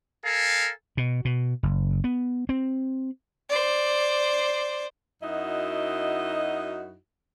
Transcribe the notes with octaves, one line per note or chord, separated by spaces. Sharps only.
A4 A#4 F5 G#5
B2
B2
F#1
B3
C4
C5 D5
F#2 D#4 E4 F#4 D#5